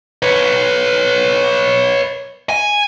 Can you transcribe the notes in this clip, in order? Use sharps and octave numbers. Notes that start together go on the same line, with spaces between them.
B4 C#5
G#5